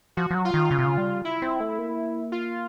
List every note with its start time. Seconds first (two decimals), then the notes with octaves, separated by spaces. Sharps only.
0.17 F3 F#4
0.30 F3
0.35 F#3
0.45 F4
0.54 D#3
0.71 C#3
0.79 C3
0.85 C#3
0.98 G3
1.25 E4
1.42 C4
1.60 A3
1.78 A#3
2.32 F4